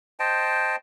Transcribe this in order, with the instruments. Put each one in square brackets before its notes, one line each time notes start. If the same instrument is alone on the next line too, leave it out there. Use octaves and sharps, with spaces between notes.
[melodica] C5 D#5 G5 A5